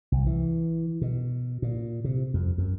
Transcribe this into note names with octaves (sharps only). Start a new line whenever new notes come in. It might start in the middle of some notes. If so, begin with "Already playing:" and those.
C2
E3
B2
A#2
C3
F2
F#2